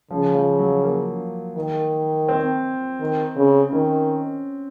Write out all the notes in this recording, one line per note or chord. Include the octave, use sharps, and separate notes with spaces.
C#3 F3
F3
F#3
A#3
D#3
C4
D#3
C#3
D#3 C#4